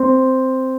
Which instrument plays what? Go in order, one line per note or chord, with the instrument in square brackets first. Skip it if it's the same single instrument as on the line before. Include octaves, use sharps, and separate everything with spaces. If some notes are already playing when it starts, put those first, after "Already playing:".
Already playing: [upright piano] C4